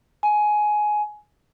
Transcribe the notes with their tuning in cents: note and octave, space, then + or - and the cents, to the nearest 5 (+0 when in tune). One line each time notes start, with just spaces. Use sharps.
G#5 +15